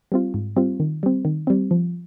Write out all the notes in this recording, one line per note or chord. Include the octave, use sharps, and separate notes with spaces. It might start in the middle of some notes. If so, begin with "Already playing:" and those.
G3 C4 F4
G#2
G3 C4 F4
D#3
G3 C4
D#3
G3 C4
F3